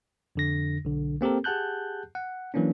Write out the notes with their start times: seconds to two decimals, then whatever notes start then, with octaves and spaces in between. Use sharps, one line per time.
0.35 F2 D3 A#6
0.85 B1 D3
1.21 A#3 C4 G4 A4 A#4
1.44 G4 G#4 F#5 A5 F#6 G6
2.15 F#5
2.54 E3 F#3 A#3 C#4 D4